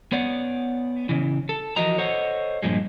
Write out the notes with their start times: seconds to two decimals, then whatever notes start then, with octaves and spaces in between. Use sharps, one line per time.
0.12 B3 C#5 D5 F#5
1.09 C#3 E3
1.49 A4
1.76 E3 F3 F#4 A#4 D#5 A#5
1.98 A4 C5 C#5 D#5 F#5
2.63 G2 A#2 F3 G#3